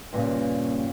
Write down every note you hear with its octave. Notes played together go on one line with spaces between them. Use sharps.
G2 A#2 C#3